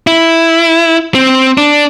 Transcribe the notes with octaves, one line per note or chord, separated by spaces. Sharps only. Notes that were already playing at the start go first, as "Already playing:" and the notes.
E4
C4
D4